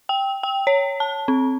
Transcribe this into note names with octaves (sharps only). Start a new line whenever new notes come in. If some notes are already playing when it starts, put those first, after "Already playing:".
G5
G5
C#5
A5
C4